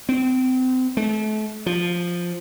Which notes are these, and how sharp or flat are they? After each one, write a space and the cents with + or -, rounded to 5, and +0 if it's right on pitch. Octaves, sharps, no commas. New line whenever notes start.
C4 -30
A3 -35
F3 +5